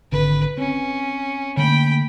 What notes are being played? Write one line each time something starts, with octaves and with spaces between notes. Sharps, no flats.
G#1 D3 B4
C4 C#4
D3 A3 A#3 G5 B5